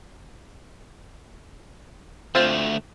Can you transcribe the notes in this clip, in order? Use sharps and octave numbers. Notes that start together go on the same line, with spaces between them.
D2 A3 C4 F4 C5